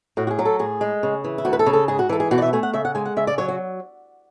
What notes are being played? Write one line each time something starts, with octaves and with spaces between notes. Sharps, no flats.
A2 F#4
F#4
G#4
F#3
A4
A2 G#4
G#3
C#3
E3
E4
D2 F#4
B4
A4
C#3
A4
G#2 G#4
F#4
E3 A4
G#4
B2 F#4
D5
E5
A3 G#5
F#5
C#3 E5
F#5
G#3 G#5
F#5
C#3 E5
D5
F#3 C#5
F#4